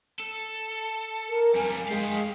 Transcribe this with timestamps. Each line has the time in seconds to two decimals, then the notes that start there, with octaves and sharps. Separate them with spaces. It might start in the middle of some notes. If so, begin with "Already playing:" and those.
0.20 A4
1.29 A#4
1.55 F2 G3 G#5
1.88 G#3 G4 F5